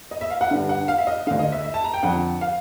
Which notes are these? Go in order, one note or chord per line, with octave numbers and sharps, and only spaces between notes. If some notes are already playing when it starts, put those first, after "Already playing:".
D#5
E5
F5
F#5
G2 D3
F#5
F5
E5
D#5
D2 D3 F5
D#5
E5
E5
A5
A#5
G5
F2 D3 F#5
F5